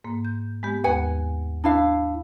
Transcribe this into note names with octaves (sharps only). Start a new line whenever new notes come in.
G#2 A#3
G6
G#3 B3 G4
D#2 B4 F#5 G#5
D4 E4 F5